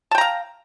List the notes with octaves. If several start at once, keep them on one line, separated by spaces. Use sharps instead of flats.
F5 G5 A5 A#5